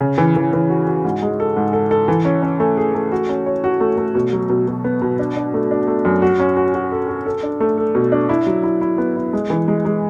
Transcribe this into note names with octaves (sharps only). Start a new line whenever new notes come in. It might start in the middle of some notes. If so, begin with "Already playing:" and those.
C#3
E3
E3
E3
F#4
F#4
G#2
G#3
A4
G#2
A4
A4
E3
C#4
C#4
A3
G#4
A3
F#4
C#4
C#5
F#4
A3
A3
B2
F#3
B2
B2
B3
B2
D4
D4
A3
D4
A3
F#2
F#4
C#4
F#4
F#4
A4
F#4
A4
D4
A3
A4
B2
D4
E4
F#3
E4
E4
B3
E4
G#3
E3
G#3
G#3